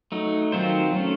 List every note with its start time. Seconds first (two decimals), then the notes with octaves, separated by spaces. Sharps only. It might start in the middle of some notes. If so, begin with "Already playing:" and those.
0.12 F#3 A3 D#4
0.52 D#3 F#3 C4 F4 C5
0.93 F#3 A3 C#4